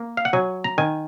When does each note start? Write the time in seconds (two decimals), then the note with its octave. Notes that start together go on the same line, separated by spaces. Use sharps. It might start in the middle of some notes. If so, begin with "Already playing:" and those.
Already playing: A#3
0.17 F5
0.25 F#5
0.33 F#3 G#5
0.64 A#5
0.78 D#3 G#5